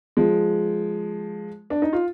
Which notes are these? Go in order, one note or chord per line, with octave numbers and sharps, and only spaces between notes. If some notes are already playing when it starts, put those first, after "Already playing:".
F3 G#3
D4
D#4
F4